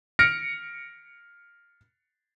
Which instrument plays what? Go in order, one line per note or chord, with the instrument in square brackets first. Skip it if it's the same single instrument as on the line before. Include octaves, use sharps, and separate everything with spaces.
[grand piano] F6 A#6 C#7 D7